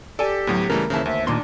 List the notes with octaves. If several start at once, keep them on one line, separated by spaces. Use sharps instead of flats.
G4 A4 D5 G#5
D2 A2 F#3 B3
C#3 E3 G3 A3 A#4
D#2 C#3 E3 C5 E5 A5
D2 E5
D#2 A#2 D4 D#4 C6